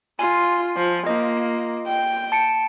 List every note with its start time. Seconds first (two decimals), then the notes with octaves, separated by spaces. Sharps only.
0.19 F4 G#5
0.76 F3
1.06 A#3 F4 D#5
1.87 G5
2.32 A5 C#7 D7